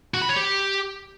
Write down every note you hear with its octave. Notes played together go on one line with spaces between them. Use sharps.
F#4
B5
C#5
G4